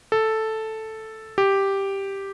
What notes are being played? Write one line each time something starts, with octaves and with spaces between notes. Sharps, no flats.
A4
G4